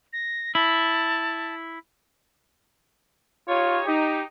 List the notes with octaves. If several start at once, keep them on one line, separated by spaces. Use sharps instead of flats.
A#6
E4 A5
D#4 F4 G4 C#5
D#4 G4